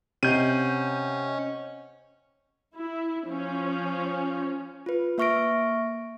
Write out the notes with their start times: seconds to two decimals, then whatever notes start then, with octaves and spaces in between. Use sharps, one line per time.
0.23 C3 C#4 C5 D#5 F#5 G6 D#7
2.74 E4
3.26 F3 C#4
4.86 F4 B4
5.18 A#3 E5 C#6 F6 A#6 D7